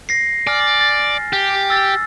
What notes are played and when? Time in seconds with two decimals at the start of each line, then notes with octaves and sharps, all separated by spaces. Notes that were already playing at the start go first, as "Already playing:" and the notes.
0.09 A#6 C7
0.47 D5 G#5 F6
0.81 A6
1.33 G4
1.70 E6 A6